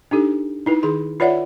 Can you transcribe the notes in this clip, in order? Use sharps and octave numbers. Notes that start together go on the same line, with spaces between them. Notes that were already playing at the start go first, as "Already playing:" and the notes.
D4 D#4 G4 A4
D#4 E4 B4
D#3 G#4 C6
F4 B4 C#5 D5 E5 F#5